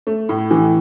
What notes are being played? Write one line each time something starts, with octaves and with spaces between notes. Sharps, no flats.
A3
A2
E3